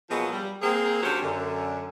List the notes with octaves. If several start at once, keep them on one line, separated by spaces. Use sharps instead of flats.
B2 F3 F#3 G#3 A#3 B3
G3
A#3 C4 G#4
D3 F#3 C#4 G4 C5
F#2 D3